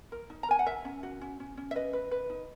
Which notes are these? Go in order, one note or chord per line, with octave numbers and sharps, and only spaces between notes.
A#4
D#4
A#5
A#4 G#5
F#5
A#4 E5
C#4
F#4
C#4
C#4
C#4
E5
B4 D#5
B4
B4
D#4